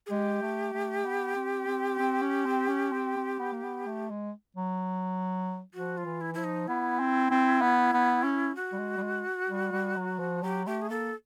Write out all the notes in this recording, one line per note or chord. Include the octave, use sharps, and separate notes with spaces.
G#4
G#3 G4
A3
A3
B3
C4
C4
C4
C#4
C4
C#4
C4
C4
B3
A#3
B3
A3
G#3
F#3
F3 F#4
F4
E3
E4
F3 E4
D#4
B3 E4
C4
C4
B3
B3
C#4
F#4
G3
G#3
G3
G#3
G3
G3
F#3
F3
F#3 G4
A3 G4
G#4
A#3 A4